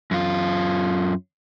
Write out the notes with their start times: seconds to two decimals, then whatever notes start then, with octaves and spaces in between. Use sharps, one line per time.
0.11 F#2 F4